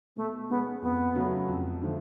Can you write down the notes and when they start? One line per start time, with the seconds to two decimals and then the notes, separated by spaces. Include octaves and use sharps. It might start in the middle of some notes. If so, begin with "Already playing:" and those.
0.16 B2 A3
0.50 G#3 B3 C#4 G#4
0.82 F2 B3
1.15 C#3 F#3 A3 C#4
1.48 F2
1.82 D3 F3 A3